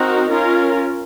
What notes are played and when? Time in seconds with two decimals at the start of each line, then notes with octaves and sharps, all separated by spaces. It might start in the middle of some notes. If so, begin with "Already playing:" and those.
Already playing: C4 D#4 F#4 A#4
0.31 C#4 F4 A#4